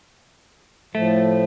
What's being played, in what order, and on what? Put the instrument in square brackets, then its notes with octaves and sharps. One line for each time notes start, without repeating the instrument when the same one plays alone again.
[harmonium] A2 F3 [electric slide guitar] A3